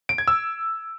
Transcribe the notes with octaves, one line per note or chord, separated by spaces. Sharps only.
D7
G#6
E6